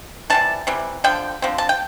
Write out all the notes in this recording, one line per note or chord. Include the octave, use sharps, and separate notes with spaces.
C3 E3 G3 A5
C3 E3 G3
D3 F3 G5
D3 F3 C4
A5
G5